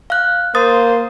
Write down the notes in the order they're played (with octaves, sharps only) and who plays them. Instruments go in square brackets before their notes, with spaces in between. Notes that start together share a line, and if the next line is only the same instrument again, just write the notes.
[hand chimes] F5 F#6
[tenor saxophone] A#3 [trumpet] C5 [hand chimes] D#6 A6